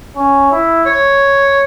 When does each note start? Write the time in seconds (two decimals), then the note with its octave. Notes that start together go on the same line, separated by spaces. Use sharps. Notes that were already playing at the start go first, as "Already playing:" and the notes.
0.16 C#4
0.51 E4
0.86 C#5